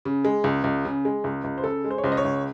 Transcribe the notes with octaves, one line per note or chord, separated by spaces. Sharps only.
C#3
G#3
C#2
C#2
C#3
G#3
C#2
C#2
C5
C#3 A4
G#3
C5
C#5
C#2 C5
D#5
C#5
C#2